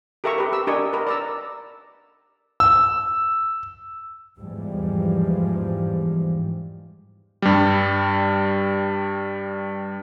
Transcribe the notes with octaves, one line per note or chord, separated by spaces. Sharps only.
G4 A4 A#4 E5 A#5 C#6
G4 B4
E6
D4 G4 A#4 D#5 G#5 C#6
A#4 B4
D5 A#5 E6
E6
E2 G#2 E3 F3 G3 G#3
G2 G3